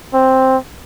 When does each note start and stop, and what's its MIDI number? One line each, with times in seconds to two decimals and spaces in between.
0.14 0.57 60